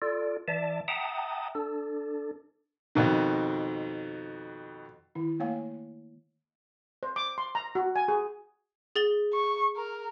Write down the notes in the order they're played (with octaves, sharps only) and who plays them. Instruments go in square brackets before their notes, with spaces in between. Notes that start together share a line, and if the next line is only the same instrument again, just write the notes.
[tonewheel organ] F4 A4 D5
E3 D5 E5 A5
E5 F#5 G5 A5 A#5 D#6
D4 A4
[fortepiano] F2 B2 D#3
[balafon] D#3 E4
A3 A#3 C#5 F5 G#5
[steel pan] C5
D6
C6
A#5
F#4
G#5
G#4
[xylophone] G#4 A6 G7
[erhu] C#6
A#4